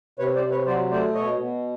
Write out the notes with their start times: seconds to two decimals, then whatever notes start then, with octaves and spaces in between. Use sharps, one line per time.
0.19 C3 B4 C#5
0.35 C5 D5
0.43 C3
0.51 B4 C#5
0.66 F#3 C5 D5
0.91 A3 C5 D5
1.14 B2 C#5 D#5
1.39 B2